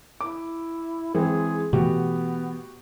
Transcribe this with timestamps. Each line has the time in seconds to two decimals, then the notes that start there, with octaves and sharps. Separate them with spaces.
0.21 E4 D6
1.14 E3 G#3 C4 G#4
1.73 B2 E3 A3 B3 F#4 G4